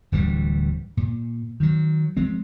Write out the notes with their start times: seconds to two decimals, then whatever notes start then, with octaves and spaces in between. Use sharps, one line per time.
0.12 D1 D2 E3 G3
0.97 A#2
1.60 D#3 F#3
2.17 F3 G#3 C4